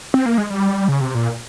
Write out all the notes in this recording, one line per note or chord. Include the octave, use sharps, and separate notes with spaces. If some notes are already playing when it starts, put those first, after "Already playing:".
C4
A#3
G#3
G3
C#3
C3
A#2